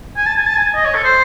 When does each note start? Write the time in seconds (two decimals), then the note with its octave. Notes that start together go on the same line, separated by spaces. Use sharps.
0.17 G#5
0.26 A5
0.37 G#5
0.47 A5
0.56 G#5
0.75 D#5
0.85 C#5
0.95 A4
1.04 C5